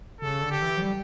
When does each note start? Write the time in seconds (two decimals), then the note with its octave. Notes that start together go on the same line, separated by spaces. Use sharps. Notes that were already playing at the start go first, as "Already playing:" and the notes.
0.21 C#3 A4
0.41 D3
0.51 G4
0.62 E3
0.77 F#3
0.82 G3